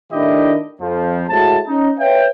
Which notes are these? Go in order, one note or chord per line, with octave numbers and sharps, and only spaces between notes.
A2 D#3 D4 E4 G4 D#5
F2 F3
A2 G#3 F#4 A5
C#4 D#4
B4 C#5 E5 F5 G5